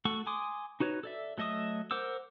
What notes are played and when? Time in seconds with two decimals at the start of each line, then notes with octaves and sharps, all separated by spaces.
0.05 A3 F#4 A4 F#5 C#6
0.27 G#5 C6 D6 D#6
0.80 D#4 F#4 B4 C#5
1.03 A4 D5 E5
1.38 F#3 A3 D#5 E5 D#6
1.91 A#4 C5 F#5 D6 E6